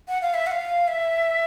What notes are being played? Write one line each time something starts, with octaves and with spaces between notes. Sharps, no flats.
F#5
F5
E5
F#5
F5
E5